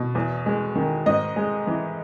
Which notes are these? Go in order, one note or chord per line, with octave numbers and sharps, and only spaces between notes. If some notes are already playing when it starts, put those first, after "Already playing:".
Already playing: B2
E2
G#3
D#3
G#2 D#5
G#3
E3